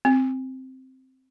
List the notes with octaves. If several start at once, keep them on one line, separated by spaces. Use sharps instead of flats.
C4